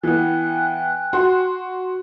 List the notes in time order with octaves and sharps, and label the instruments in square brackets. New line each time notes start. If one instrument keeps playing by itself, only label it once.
[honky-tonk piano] E3 B3 [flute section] G5 G#5 F#6
[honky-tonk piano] F#4 C6